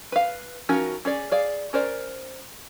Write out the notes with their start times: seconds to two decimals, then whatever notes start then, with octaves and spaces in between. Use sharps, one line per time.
0.12 B4 F5
0.69 F3 C#4 D#4 F#4 A#4
1.05 C#4 G#4 D5
1.31 G#4 D5 F5
1.73 C#4 A#4 C5 D5